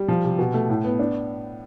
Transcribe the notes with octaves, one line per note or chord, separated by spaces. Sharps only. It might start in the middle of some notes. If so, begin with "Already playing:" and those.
Already playing: G3
F3
C3
B2
A3
A2
B3
D4